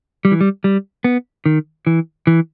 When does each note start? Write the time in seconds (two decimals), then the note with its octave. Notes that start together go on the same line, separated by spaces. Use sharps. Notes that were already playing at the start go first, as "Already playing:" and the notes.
0.25 G3
0.31 E3
0.41 G3
0.64 G3
1.04 B3
1.46 D#3
1.87 E3
2.27 E3